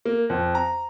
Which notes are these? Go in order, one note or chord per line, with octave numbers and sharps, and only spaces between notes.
A#3
F2
A#5